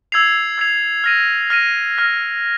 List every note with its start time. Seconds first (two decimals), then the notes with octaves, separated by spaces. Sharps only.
0.12 E6 G#6 C7 F7
0.58 E6 G#6 C7 F7
1.04 F6 A#6 D#7
1.50 F6 A#6 D#7
1.98 F6 A#6 D#7